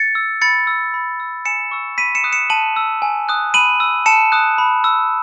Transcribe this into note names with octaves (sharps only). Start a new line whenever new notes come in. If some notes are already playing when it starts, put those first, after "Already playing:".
Already playing: A6 C#7
E6
B5 A6 C#7
E6
B5
E6
G#5 C#7 E7
C#6 E6
B5 B6 D#7
C#7 E7
D#6 F#6
C#7 E7
A5 D#7 F#7
E6
G#5
D#6 F#6
B5 D#7 F#7
E6
A5 C#7 E7
D#6 F#6
B5
E6